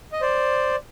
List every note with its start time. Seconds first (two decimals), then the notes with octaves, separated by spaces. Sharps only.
0.12 D#5
0.21 C5 D5